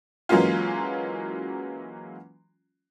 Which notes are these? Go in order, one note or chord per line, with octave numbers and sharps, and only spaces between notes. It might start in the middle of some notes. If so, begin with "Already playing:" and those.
E3 F#3 G#3 A#3 C#4 F4